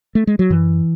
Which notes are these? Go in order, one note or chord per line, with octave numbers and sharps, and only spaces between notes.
A3
G#3
F#3
F#2 E3